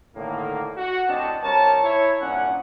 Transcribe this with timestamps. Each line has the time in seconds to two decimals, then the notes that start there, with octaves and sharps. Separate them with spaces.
0.16 A2 D3 D#3 A#3
0.77 F#4
1.08 A1 C4 D4 D#5 A5
1.43 C2 G3 A#4 C#5 A5
1.82 E4 C#5
2.20 C2 A#2 C#4 D4 F#5